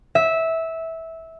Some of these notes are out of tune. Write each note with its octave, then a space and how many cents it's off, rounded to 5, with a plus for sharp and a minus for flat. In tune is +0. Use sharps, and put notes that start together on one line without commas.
E5 -15